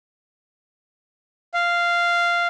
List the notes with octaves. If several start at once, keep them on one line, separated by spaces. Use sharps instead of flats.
F5